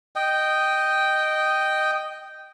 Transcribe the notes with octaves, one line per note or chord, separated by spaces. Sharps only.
D#5 G5